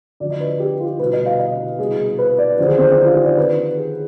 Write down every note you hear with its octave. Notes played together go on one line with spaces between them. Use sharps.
D2 D3 F3 D5
D#5
B4
G4
F4
C2 B2 B4
D#5
F5
D#5
C2 B2 G#4
B4
D5
D#2 D3 F3 C5
G#4
C4
D4
D#4
F4
G4
D5
D#2 D#3 B4
G#4